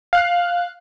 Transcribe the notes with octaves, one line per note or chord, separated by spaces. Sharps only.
F5 F#6